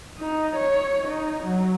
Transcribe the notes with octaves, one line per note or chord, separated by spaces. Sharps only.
D#4
C#5
D#4
F#3